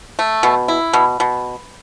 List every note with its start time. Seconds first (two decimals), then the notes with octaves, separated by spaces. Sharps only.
0.19 A3
0.43 B2
0.68 E4
0.93 B2
1.20 B2